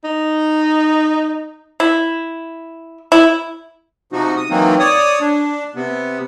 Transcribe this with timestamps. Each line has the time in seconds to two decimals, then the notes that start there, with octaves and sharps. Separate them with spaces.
0.04 D#4
1.80 E4
3.12 E4
4.12 C3 F3 D#4 F#4
4.37 D#6
4.50 D#3 E3 F#3 A#3 C4 D#4
4.79 C#5 D5 D#6
5.21 D4
5.75 C3 B3